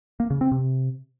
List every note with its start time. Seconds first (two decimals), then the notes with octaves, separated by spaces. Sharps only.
0.20 A#3
0.30 C#3
0.41 C4
0.52 C3